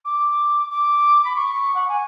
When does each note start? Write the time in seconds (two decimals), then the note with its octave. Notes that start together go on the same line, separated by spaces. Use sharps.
0.04 D6
0.70 D6
1.24 B5
1.35 C#6
1.74 F#5
1.88 G#5